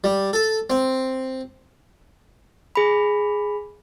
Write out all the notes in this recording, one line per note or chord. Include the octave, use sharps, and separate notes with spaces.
G3
A4
C4
G#4 B5